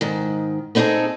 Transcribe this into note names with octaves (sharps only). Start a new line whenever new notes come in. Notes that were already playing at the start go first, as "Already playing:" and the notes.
G#2 D#3
B3 C4 D#4 E4 G#4 A4